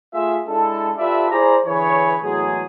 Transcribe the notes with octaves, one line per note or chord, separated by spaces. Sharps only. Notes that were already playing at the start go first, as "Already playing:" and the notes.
A3 F4 G#4 E5
G#3 D4 E4 A4
F4 G4 A4 B4 D5 E5
E4 G#4 C5 D5 A#5
D3 E3 G#4 B4 C#5
E2 A2 F#3 G#3 G#4